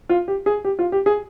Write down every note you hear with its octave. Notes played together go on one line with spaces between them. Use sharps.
F4
G4
G#4
G4
F4
G4
G#4